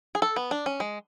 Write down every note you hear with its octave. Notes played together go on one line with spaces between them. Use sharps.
G#4
A4
B3
D4
C#4
G#3